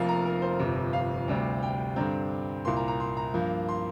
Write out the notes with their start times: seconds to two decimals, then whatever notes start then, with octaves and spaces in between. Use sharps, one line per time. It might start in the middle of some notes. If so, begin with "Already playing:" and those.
Already playing: F1 F2 F3 A#3 F5
0.09 A#5
0.25 A#4
0.42 C5
0.59 G1 F2 C3
0.93 F5
1.28 D2 C3 G3
1.63 G5
1.96 G2 D3 G3 C4 A#5
2.65 C2 A#2 A#3 C6
2.76 A#5
2.88 A#5
3.00 C6
3.17 A#5
3.34 G2 F3 A#3
3.69 C6